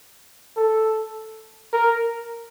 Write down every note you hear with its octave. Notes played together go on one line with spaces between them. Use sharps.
A4
A#4